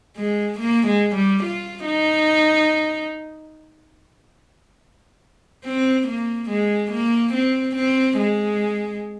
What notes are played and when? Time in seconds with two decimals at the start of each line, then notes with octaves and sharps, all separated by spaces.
0.17 G#3
0.60 A#3
0.87 G#3
1.15 G3
1.43 F4
1.86 D#4
5.65 C4
6.07 A#3
6.50 G#3
6.92 A#3
7.34 C4
7.76 C4
8.18 G#3